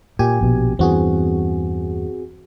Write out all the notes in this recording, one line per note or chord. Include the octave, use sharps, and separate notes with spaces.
A#2 G4 G#5
A#1 B2
E2 G2 E3 C4 F#4 G#4